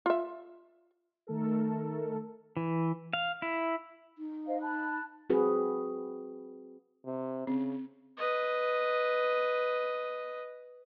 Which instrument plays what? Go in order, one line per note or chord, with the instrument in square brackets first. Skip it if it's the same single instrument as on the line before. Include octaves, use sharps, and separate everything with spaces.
[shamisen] F4 E5
[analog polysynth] D#3 A3 A4 A#4
[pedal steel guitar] E3
F5
E4
[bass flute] D#4
[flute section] C5 D#5 F5
A5 B5 F#6
[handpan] C4 F#4 G#4 B4
[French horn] C3
[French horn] C#3 [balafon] C4
[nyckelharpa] B4 D#5